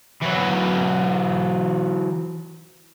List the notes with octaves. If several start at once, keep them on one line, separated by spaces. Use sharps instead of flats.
E3 F#3